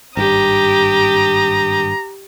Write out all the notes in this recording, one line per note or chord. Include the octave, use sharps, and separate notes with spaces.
G#1 G2 G4 A#5 D#6